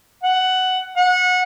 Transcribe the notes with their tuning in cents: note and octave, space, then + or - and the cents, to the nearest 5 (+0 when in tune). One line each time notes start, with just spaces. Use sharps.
F#5 +10
F#5 -25